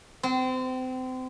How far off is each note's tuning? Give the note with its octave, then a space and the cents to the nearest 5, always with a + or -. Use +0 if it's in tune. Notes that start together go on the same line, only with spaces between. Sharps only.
C4 -30